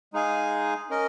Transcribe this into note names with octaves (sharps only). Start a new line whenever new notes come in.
G#3 D#4 G#4 F5 G#5
C#4 A#4 D#5